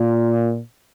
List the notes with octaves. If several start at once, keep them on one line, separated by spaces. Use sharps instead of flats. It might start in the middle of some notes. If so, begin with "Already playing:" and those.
Already playing: A#2